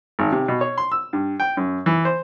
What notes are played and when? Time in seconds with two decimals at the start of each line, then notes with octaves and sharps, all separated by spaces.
0.19 G#1
0.32 C3
0.48 B2
0.61 C#5
0.78 C6
0.92 E6
1.13 G2
1.40 G5
1.57 F#2
1.86 E3
2.05 C5